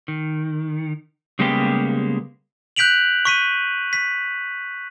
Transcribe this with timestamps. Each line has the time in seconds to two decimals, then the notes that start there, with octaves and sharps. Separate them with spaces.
0.08 D#3
1.39 C#3 G3 G#3 A#3 B3 G4
2.76 F#6 G6 B6 D7 F7 F#7
3.25 C#6 B6 D#7
3.93 B6